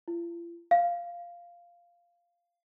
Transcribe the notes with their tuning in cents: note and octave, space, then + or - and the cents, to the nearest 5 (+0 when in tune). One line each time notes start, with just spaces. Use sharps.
F4 -45
F5 -5